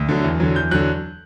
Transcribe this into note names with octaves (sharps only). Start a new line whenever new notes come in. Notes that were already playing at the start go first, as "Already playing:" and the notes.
Already playing: D2
D3 F#3
E2
D3 F#3
E2 G6
D3 F#3 F#6